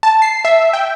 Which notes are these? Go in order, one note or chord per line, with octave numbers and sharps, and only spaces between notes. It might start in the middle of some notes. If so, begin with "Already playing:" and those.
A5
C7
E5
G5